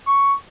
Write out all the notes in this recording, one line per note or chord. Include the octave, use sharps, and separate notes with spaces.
C#6